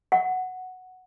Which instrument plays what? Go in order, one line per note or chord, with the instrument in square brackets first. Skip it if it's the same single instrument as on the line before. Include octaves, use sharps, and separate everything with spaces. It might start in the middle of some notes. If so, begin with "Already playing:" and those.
[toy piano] F#5